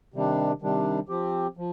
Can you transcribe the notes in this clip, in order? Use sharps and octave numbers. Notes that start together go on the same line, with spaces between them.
C3 D#3 G3 D4
C3 D#3 G3 D4
F3 C4 G4
F3